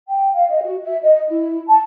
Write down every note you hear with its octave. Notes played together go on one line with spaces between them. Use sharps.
G5
F5
D#5
F#4
E5
D#5
E4
A5